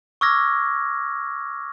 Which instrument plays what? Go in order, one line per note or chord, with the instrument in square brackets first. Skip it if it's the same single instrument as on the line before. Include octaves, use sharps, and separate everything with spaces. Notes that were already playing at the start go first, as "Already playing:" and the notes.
[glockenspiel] C#6 D6 E6 F6 G#6 A#6